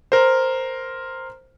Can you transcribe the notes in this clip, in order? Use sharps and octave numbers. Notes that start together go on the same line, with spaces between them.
A#4 C5